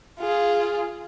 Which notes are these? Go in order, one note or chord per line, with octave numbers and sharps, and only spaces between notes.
F4 G#4